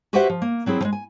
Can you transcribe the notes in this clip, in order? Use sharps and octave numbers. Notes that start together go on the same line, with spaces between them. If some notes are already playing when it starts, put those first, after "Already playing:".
F#4 G4 B4 C5 E5 F#5
F3
A#3
F#3 C4 E4 G#4
F3 G#3
G#5